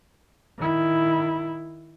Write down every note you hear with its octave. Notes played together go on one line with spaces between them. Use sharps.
D#3 E4